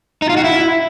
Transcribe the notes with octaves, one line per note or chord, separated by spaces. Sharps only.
D#4
F4
F#4
E4